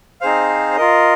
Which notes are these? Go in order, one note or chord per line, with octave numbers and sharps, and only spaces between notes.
C4 D#4 G#4 C5 F5
F4 A#4 D#5